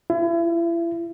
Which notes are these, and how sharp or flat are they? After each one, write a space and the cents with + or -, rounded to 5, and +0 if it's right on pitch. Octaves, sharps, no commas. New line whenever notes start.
E4 +35